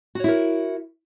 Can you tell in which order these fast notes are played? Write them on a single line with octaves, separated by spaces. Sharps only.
F#4 C#5 E4 A#4